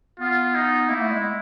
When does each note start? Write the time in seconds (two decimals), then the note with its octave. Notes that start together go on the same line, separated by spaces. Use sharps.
0.19 B3 F4
0.55 D#4
0.89 A#3 E4
1.01 A3
1.12 G#3